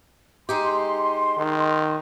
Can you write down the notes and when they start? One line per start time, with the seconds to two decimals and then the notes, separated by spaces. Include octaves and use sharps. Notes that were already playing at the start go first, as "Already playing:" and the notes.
0.49 G#3 D#4 G4 C6
1.38 D#3